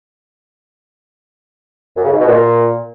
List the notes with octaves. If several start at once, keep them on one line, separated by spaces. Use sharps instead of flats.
F#2
C#3
G#2
B2
A#2